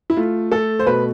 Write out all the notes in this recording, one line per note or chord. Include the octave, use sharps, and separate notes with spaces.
E4
A3 F4
A3 A4
C5
B2 B4